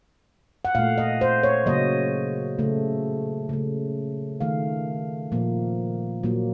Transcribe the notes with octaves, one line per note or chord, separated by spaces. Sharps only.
F#5
A#2 A3 F5
D#5
C5
C#5
C#3 F#3 A#3 D#5
C#3 A3
C#3 A3
D#3 A3 F5
A#2 F3 A#3
A#2 F#3 A#3